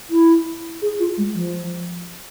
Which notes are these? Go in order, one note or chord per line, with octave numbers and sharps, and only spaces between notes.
E4
G#4
F4
G#3
F3